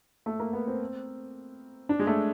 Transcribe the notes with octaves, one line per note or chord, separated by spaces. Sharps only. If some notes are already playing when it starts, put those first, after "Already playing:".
A3
A#3
B3
C4
D4
G#3
A3